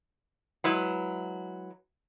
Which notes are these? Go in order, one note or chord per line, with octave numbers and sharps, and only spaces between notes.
F#3 G#3 E4 B4